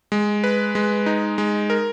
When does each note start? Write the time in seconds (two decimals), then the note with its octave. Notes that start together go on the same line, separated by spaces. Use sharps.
0.12 G#3
0.44 B4
0.75 G#3
1.06 D#4
1.38 G#3
1.70 A#4